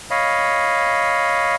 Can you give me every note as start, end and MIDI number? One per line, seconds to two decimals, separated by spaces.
0.11 1.56 73
0.11 1.56 75
0.11 1.56 77
0.11 1.56 83